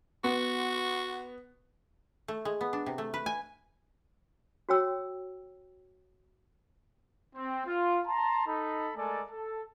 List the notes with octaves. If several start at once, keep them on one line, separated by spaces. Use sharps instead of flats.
B3 F#4
A3
G#3
B3
D4
C3
A3
B4
G#5
F#4 C#5 G5 E6
C4
F4
A5 A#5 C6
D#4 A4 B5
G#3 A3 A4 A#4 D5 G#5
A4